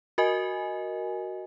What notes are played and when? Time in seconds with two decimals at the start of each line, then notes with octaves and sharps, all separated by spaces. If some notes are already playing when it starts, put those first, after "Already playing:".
0.18 F#4 A#4 D#5 G#5